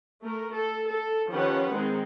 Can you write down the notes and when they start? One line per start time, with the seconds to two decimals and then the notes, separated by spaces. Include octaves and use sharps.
0.21 A3 A#4
0.53 A4
0.89 A4
1.29 D#3 F3 C#4 G4 B4 F#5
1.71 D#3 G#3 C4 D#4